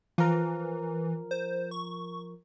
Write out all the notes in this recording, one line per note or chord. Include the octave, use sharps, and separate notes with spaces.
E3 F3 A#4
C5
C#6